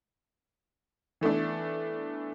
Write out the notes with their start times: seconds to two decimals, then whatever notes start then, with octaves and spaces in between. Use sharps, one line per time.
1.21 E3 A3 B3 D4